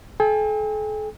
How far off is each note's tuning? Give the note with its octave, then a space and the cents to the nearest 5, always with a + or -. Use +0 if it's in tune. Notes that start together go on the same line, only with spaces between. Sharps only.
A4 -45 G5 +45